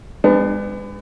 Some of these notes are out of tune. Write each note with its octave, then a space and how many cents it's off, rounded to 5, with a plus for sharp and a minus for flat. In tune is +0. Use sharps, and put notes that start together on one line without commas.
G#3 -25 B3 +30 D4 +25